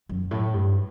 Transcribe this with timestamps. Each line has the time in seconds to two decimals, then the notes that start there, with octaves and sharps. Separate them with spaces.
0.09 F#2
0.31 A2
0.54 G2